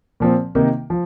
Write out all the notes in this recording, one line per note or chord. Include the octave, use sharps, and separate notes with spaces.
A#2 F3 C4
C3 D#3 A#3 D#4
F3